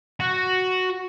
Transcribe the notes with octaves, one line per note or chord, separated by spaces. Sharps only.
F#4